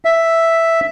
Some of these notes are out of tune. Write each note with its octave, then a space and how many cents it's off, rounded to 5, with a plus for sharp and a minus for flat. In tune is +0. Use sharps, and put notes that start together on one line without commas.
E5 +0